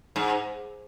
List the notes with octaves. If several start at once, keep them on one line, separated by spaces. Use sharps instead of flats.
G#2